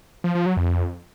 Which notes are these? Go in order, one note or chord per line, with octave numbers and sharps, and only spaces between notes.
F3
F3
F#3
F2